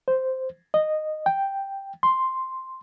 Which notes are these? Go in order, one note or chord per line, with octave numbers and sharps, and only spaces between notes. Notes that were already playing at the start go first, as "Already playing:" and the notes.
C5
D#5
G5
C6